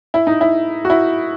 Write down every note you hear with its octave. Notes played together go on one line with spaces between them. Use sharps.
E4
D#4
E4
F#4
E4